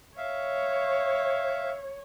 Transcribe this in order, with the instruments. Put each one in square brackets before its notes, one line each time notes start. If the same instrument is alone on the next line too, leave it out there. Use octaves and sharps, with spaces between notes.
[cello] C#5 [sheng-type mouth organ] E5 F5